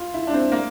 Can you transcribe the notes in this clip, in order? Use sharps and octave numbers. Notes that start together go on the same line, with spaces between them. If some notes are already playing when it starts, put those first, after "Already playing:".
Already playing: F4
E4
D4
C4
A#3